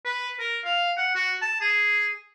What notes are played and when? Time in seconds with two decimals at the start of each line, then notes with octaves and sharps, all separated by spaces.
0.05 B4
0.39 A#4
0.65 F5
0.97 F#5
1.15 F#4
1.42 A5
1.61 G#4